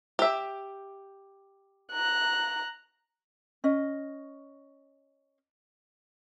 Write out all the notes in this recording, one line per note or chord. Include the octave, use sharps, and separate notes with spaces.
G4 E5
A#5 F#6
C#4 D#5